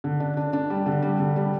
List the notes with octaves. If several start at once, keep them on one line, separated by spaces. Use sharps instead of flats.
D3
D4
D4
D4
G3
D3
G3
D3
G3